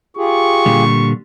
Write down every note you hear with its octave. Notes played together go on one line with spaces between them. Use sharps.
F4 G4 G#4 C#6
A#2 D3 G3